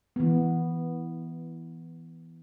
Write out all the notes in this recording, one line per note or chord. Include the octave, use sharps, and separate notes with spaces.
E3 B3